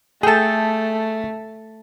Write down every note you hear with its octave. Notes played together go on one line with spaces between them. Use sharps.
A3 G#4 A4 G5 A5